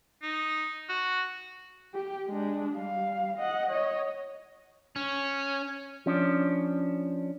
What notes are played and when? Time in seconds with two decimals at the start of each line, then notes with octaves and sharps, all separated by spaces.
0.22 D#4
0.89 F#4
1.94 G4
2.27 G#3 D4
2.74 G3 F5
3.38 D#5 F#5
3.70 C#5 D#5
4.96 C#4
6.06 F3 C#4 D4